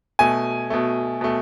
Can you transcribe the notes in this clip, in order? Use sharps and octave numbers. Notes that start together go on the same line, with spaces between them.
B2 A3 G#5
B2 A3
B2 A3